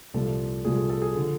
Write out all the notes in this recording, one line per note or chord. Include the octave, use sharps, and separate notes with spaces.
C2 A#2 F3 A4
C2 A#2 F3 G#4
A4
A4
G#4
D3 F3 A4